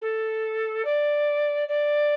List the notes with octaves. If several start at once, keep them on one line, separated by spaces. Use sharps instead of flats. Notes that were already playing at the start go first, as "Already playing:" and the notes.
A4
D5
D5